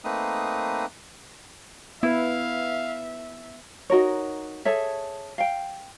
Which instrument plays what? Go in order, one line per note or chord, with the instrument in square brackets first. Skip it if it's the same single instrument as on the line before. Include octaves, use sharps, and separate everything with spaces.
[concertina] A3 A#3 C4 D#4 B4 D#6
[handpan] B3 B4 [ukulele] E4 [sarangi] E5 [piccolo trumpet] F5
[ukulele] D#4 F#4 A#4 C#5
G#4 A4 C#5 E5
F5 G5